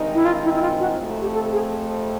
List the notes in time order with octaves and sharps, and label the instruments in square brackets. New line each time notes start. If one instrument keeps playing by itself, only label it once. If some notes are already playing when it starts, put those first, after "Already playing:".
Already playing: [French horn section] G2 D#3 G#3 C4 D#4
[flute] E4
F4
E4
E4
F4
F#4
[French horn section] F2 C3 F3 A3
[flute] G4
A4
G#4